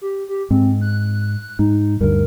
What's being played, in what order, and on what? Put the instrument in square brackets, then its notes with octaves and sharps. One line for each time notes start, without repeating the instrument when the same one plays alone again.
[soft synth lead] G4
G4
[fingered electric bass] G#2 [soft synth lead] C4
[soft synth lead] F#6
[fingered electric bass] G#2 [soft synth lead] D#4
[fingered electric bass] D2 G2 [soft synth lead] A#4